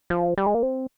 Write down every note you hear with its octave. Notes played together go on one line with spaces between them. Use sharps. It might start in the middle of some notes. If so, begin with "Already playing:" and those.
F3
G3
G#3
A#3
C4